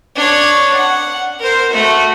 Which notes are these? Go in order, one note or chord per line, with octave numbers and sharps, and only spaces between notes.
D4 C#5
F#5
A#4 C5
A3 F#4